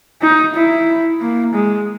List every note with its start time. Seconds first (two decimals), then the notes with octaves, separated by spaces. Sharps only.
0.22 D#4
0.55 E4
1.21 A#3
1.54 G#3